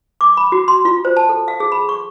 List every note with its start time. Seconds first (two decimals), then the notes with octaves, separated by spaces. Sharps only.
0.21 D6
0.37 B5
0.52 F#4
0.68 C6
0.85 F4
1.05 C5
1.17 A5
1.29 A4
1.48 F5
1.60 G#4
1.72 B5
1.89 C#6